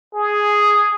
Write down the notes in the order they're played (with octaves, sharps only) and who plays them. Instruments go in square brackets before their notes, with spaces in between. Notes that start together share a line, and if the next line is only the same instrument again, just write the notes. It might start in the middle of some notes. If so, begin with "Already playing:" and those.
[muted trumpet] G#4